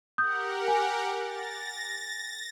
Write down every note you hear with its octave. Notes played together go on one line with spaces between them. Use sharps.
G4 A#4 F#5 D#6 G6
G#5
A6 A#6